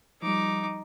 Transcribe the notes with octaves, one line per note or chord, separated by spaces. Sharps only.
F3 G3 D#4 D6